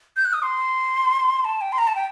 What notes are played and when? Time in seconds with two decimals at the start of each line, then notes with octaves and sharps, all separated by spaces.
0.17 G6
0.25 F#6
0.33 D#6
0.43 C6
1.45 A5
1.61 G5
1.72 C6
1.78 A#5
1.87 A5
1.95 G5